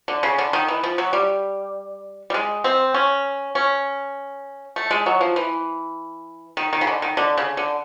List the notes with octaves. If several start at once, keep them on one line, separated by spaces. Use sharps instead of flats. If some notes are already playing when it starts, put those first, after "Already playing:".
D3
C#3
D3
D#3
E3
F3
F#3
G3
G3
G#3
C4
C#4
C#4
A3
G#3
F#3
F3
E3
D#3
D#3
C#3
D3
D#3
D3
C#3
D3